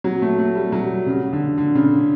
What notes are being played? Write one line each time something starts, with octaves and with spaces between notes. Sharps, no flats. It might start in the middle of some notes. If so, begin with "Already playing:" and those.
F#3
A3
A3
G3
F#3
C#3
D3
D3
C#3